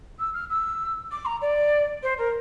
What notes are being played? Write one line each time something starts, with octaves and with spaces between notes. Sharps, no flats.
E6
F6
E6
D6
A#5
D5
C5
A#4